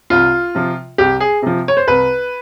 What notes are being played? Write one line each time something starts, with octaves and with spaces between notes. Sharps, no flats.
C2 F4
C3 F3
C2 G4
G#4
C3 F3
C#5
C5
C2 B4